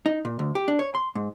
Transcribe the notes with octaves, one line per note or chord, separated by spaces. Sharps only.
D#4
A#2
D2
G4
D4
C#5
C6
G#2